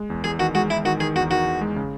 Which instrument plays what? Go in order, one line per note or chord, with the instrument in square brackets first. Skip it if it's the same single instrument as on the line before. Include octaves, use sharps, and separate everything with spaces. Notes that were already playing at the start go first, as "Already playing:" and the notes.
Already playing: [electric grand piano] G#3
E2
[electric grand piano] E2 [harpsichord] G#4
[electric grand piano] D#3 [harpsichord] F#4
[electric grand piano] G#3 [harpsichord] F#4
[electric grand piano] G#3 [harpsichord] E4
[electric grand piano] D#3 [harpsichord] F#4
[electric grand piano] D#3 [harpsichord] G#4
[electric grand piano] E2 [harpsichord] F#4
[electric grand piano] D#3 [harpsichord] F#4
[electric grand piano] D#3
G#3
C#3